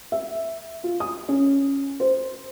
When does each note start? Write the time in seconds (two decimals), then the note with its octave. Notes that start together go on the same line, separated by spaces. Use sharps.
0.12 E5
0.83 F4
1.00 D#6
1.29 C#4
2.00 C5